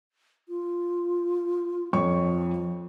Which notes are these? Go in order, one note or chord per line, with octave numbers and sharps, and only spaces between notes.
F4
F2 F3 C#5 C#6